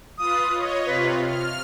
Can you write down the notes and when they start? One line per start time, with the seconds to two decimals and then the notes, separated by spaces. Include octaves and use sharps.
0.18 F4 B4 D#6
0.52 C#5 D#5
0.86 C3 F4 B4
1.22 F6